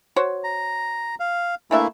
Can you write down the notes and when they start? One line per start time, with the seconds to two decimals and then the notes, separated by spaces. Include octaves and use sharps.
0.16 F#4 C5 C#5
0.44 A#5
1.20 F5
1.71 E3 A3 A#3 D4 E4 E5